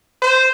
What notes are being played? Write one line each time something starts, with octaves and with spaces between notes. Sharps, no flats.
C5